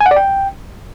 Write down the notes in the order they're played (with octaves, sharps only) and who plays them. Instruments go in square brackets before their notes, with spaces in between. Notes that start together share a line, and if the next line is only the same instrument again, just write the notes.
[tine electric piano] G#5
F#5
D5
G5